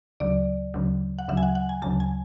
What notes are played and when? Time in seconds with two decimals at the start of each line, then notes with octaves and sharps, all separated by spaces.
0.20 D2 C#3 F#3 D5
0.74 D2 C#3 F#3
1.19 F#5
1.28 D2 C#3 F#3 E5
1.37 G#5
1.43 F#5
1.55 F#5
1.69 G#5
1.82 D2 C#3 F#3 A5
2.00 G#5